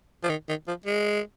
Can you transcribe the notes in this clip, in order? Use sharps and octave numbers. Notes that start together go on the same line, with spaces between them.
F3
D#3
D#3
F3
G#3